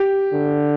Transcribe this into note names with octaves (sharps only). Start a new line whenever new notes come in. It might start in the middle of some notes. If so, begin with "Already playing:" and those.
Already playing: G4
D3